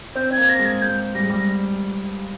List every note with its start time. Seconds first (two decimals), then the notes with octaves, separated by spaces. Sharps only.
0.15 C4 G6
0.31 C4 G#6
0.37 A#3
0.49 A#6
0.59 G#3
0.65 G#6
0.82 G#3 G6
1.15 G3 A#6
1.22 G#3
1.30 G3 A#6